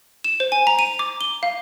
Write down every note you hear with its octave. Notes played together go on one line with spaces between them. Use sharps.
E7
C5
G#5
A#5
D#7
D6
G7
F5